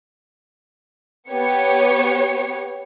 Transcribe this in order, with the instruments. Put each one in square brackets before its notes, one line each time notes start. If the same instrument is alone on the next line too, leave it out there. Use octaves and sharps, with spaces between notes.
[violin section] B3 G4 C#5 C#7